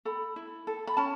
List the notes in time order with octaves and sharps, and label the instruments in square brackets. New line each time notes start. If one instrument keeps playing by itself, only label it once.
[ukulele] A4 B5
E4
A4
B5
C#4 A5